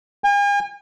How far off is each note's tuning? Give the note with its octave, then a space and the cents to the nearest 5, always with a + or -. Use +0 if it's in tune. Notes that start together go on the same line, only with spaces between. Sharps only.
G#5 -45